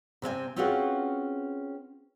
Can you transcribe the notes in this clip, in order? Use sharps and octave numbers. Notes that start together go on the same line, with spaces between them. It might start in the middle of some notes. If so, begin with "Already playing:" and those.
C3 C4 D#5 G#5
C4 C#4 F4 F#4 G#4 B4